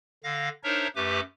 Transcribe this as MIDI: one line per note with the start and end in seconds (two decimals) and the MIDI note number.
0.24 0.49 50
0.24 0.49 77
0.24 0.49 94
0.64 0.87 62
0.64 0.87 63
0.64 0.87 70
0.64 0.87 72
0.64 0.87 73
0.64 0.87 76
0.96 1.20 42
0.96 1.20 57
0.96 1.20 67
0.96 1.20 71
0.96 1.20 86